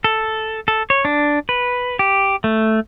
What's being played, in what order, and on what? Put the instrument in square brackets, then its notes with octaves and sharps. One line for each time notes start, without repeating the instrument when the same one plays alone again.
[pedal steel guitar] A4
A4
C#5
D4
B4
G4
A3